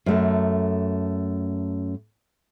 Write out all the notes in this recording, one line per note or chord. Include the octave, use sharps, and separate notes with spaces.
F#2 A3